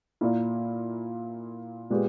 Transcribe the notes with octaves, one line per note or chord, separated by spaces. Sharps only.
A#2 A#3 E4
A#2 G#3 B3 G4